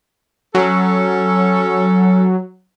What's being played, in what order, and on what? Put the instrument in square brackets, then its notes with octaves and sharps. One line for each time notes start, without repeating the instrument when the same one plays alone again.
[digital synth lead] F#3 [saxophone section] C#4 A4